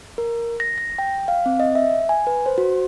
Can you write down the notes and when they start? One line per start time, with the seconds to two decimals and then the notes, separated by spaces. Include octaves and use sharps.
0.18 A#4
0.60 A#6
0.78 A#6
0.98 G5
1.28 F5
1.46 C4
1.60 D#5
1.75 E5
2.09 G#5
2.27 B4
2.46 C5
2.58 F#4